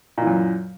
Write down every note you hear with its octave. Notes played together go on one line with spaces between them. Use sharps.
F#2 A#2 E3